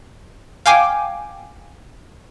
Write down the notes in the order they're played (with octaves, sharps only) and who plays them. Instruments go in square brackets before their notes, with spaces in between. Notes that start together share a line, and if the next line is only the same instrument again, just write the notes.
[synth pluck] F5 G5 G#5 D6